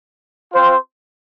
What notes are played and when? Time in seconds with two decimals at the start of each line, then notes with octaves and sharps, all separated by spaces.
0.53 C4 F4 C5